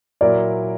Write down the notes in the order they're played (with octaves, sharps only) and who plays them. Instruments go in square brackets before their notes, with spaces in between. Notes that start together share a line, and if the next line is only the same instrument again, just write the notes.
[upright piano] A#2 F#3 A#3 E4 A#4 [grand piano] D5